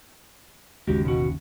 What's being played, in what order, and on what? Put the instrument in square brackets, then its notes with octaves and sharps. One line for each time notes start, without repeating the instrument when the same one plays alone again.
[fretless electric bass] G1 D#2 C#3 [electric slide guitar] G#3 F#4 G4
[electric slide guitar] B2 F#4